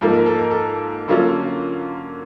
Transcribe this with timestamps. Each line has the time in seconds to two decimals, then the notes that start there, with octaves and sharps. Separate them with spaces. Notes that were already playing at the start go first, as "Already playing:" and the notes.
0.01 G#2 F3 A#3 A4
0.13 A#4
0.26 A4
0.39 A#4
0.51 A4
1.08 D3 F#3 A#3 C#4 F4 A4